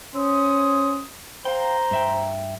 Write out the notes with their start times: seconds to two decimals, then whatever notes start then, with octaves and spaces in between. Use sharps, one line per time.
0.14 C#4 C5 D#6
1.45 C5 F5 G5 A#5
1.91 G2 E5 G5